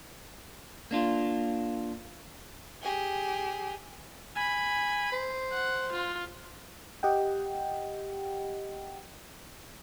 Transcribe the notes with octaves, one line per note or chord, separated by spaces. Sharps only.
A#3 D4 F4
G4 G#4
G#5 B5
C5
F#5
F4
G4 D#5 F#5 G5